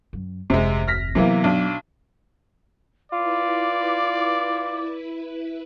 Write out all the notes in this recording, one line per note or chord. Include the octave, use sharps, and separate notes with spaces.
F#2
F1 D2 C3 G#3
F6 A#6 B6
C3 E3 F#3 A#3 B3
B1 D4
E4 F4 B4 D5 D6